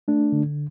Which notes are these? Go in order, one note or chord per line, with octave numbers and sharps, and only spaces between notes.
A3 D4
D3